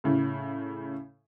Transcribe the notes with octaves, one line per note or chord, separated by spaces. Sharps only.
A2 C#3